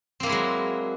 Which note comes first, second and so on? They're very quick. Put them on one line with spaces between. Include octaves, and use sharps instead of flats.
C4 A#3 E4 G#3 F#3